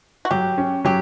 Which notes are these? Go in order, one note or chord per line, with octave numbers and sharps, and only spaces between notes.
F#4
F#3 G4
C#4
F#3 G4